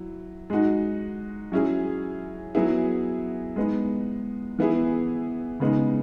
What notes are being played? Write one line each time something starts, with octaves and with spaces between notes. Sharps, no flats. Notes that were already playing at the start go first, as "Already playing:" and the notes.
Already playing: F#3 E4
G#3 D#4 F#4
F#3 C#4 E4 G#4
F#3 B3 E4 G#4
G#3 B3 D#4
E3 B3 E4 G#4
C#3 G#3 B3 D#4